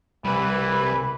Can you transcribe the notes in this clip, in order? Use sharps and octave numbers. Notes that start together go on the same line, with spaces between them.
C2 E3 G3 B4 B5